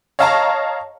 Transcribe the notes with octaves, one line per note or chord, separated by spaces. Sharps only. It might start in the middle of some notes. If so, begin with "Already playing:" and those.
C#5 D#5 F5 A5 A#5 C#6